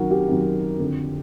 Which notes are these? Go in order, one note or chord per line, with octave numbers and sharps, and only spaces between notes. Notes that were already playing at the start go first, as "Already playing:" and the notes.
Already playing: F#2 D#3 F#4 A#4
G4
F#2 D#3
F2 D3